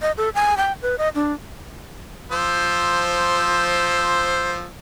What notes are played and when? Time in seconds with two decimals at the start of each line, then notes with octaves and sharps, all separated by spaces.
0.02 D#5
0.17 A4
0.35 G#5
0.57 G5
0.82 B4
0.98 D#5
1.15 D4
2.32 F3 C5 E6